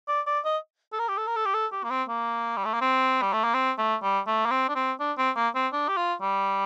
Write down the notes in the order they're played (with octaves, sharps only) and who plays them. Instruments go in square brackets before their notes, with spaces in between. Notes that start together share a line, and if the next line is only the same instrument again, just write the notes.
[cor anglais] D5
D5
D#5
A4
A#4
G4
A4
A#4
A4
G4
A4
G4
A#3
C4
A#3
G3
A3
A#3
C4
G3
A3
A#3
C4
A3
G3
A3
A#3
C4
D4
C4
D4
C4
A#3
C4
D4
G4
F4
G3